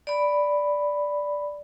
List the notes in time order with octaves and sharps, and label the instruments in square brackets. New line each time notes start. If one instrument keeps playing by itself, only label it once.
[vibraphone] D5 B5